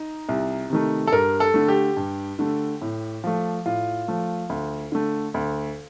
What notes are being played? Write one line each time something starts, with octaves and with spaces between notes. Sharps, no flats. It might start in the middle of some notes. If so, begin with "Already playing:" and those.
Already playing: D#4
C2
C3 D#3 A3
A4
G2 A#4
A4
D3 A3
G4
G2
D3 A3
A2
F3 A3
A2 F4
F3 A3
D2
D3 A3
D2